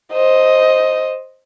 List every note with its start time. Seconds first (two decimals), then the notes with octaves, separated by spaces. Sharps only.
0.13 C5 D#5